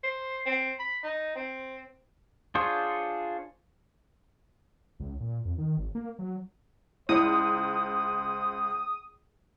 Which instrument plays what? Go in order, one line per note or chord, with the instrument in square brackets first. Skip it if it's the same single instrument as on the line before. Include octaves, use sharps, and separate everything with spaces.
[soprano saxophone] C5
C4
B5
D#4
C4
[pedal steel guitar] D4 F4 G#4 C5 C#5
[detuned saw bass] C#2
A#2
F2
D#3
G#1
A#3
F#3
[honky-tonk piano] C#2 [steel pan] E4 D5 [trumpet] C5 [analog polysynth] D#6